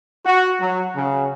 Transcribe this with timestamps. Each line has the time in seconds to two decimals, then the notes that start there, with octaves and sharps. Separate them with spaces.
0.25 F#4
0.60 F#3
0.95 C#3